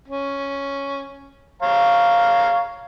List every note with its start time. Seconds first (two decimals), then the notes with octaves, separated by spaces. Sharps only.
0.08 C#4
1.62 C#5 F5 A#5